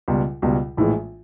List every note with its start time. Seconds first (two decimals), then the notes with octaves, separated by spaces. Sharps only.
0.08 C#2 B2 G3
0.42 C#2 B2 G3
0.77 A#1 A2 E3 G#3